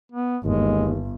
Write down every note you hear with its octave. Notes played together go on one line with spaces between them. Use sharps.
B3
G1 D#2 G#3